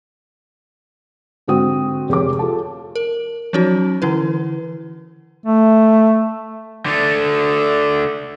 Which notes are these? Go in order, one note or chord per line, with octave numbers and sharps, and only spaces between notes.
G#2 D3 C4 F#4 D#6
F1 G4 G#4 C#5 D6
F4 A4 A5
A#4
F3 F#3 C#4 D#4 F#4
D3 E3 E4 B4
A3
D3 A3